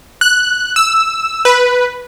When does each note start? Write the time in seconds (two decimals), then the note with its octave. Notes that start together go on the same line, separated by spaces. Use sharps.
0.21 F#6
0.76 E6
1.45 B4